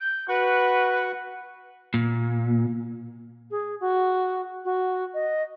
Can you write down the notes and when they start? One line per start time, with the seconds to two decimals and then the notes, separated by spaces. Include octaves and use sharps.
0.01 G6
0.28 F#4 B4 F#5 C#6
1.94 A#2
3.51 G#4
3.81 F#4
4.65 F#4
5.14 D#5